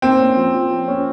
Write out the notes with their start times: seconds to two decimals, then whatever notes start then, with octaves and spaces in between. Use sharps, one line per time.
0.02 A#3 C4
0.20 C#4
0.36 F3
0.53 F4
0.71 A#3
0.88 C#4